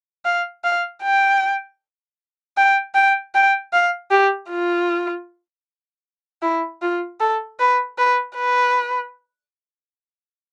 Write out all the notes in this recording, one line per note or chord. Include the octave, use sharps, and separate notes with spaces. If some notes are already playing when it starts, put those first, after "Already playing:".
F5
F5
G5
G5
G5
G5
F5
G4
F4
E4
F4
A4
B4
B4
B4